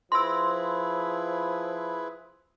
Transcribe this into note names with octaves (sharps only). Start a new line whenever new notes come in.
F3 E4 G#4 B4 C6 E6